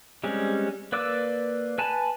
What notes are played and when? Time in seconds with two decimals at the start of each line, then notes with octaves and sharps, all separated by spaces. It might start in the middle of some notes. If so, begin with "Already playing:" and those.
0.24 G3 G#3 C4 C#4
0.92 A#3 B4 D5 D6 E6
1.78 B4 G#5 A5 B5